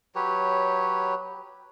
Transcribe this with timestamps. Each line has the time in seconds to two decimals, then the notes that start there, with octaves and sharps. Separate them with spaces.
0.15 F#3 G4 B4 C#5